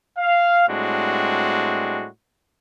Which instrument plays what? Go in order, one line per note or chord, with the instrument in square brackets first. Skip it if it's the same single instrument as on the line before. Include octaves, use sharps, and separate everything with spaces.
[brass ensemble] F5
A2 G3 G#3 C4 D4 F#4